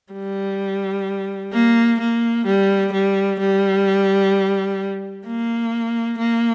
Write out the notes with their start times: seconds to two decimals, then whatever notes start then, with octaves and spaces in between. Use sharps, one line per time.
0.13 G3
1.53 A#3
2.00 A#3
2.46 G3
2.93 G3
3.40 G3
5.26 A#3
6.18 A#3